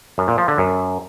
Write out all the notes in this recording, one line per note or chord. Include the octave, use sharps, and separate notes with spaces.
F#2
A#2
F3
D3
F#2